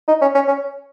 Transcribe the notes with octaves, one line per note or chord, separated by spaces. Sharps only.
D#4
C#4
C#4
C#4